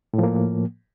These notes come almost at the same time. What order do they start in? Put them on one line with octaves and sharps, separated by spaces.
A2 F3 A#3